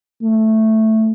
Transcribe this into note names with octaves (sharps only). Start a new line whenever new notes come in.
A3